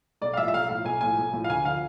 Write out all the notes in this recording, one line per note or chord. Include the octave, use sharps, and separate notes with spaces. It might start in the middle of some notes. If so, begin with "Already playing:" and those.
B1 D5
F5
A2 F3 E5
E5
B1 F5
A2 F3 F5
B1 G#5
A2 F3 G#5
B1
A2 F3
F5
D2 G#5
D3 F3 F5